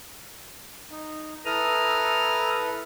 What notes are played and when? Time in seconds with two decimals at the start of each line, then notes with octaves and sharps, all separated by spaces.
0.91 D#4
1.46 E4 A4 B4 A#5 D#6 F6